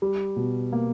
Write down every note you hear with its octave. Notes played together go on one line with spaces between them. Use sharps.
G3
B2
A#3